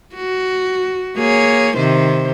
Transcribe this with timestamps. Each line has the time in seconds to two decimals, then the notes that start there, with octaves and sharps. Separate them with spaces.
0.15 F#4
1.17 A#3 G#4 C#5
1.77 C3 D#3 C5